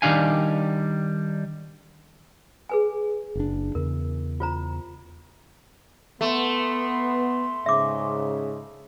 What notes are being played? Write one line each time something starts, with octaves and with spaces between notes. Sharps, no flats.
D#3 G3 D4 F5 G#5
G#4 B4 G#5
F#1 D4
E2 C#3 A#4
F4 C5 A#5
A3 B3 C6
G#2 C#3 E5 D6